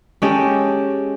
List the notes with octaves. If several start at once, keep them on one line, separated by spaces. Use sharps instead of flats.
G#3 C#4 G4 A4